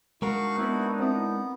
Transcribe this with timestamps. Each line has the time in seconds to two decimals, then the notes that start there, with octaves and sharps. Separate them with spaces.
0.22 G#3 D4 D#4 F#4 A#4 F5 C#6
0.58 A#3 B3 E4 F#4 B4
1.00 B3 C4 E4